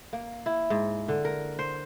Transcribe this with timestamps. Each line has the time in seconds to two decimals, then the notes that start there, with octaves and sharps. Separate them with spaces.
0.13 A#3
0.46 E4
0.70 G#2
1.08 D3
1.25 A#4
1.59 C5